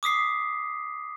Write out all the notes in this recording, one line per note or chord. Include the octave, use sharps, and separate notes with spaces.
D6 D#6 B6 C7